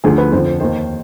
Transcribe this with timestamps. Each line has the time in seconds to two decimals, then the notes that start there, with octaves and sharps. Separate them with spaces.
0.04 D2 D3 F3 G#4
0.18 B4
0.32 F2 D3 F3 C5
0.47 C5
0.60 D#2 D#3 C5